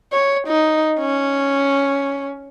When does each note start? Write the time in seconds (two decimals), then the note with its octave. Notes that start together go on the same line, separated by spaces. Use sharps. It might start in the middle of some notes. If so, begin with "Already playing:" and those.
0.12 C#5
0.47 D#4
0.99 C#4